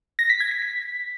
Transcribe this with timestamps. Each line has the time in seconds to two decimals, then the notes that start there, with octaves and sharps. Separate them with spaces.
0.19 A#6
0.30 B6
0.40 G#6
0.51 B6
0.62 B6